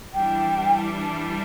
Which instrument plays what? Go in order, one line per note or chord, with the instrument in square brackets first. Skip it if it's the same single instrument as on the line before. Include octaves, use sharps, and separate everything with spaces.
[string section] E3 G3 D4 [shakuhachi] G5